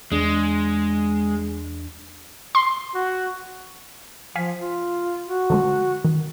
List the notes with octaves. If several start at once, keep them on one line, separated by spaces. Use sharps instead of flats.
E2 G#3 D4
C6
F#4
F3 F5 G#5 B6
F4
F#4
D3 F3 G#3
D#3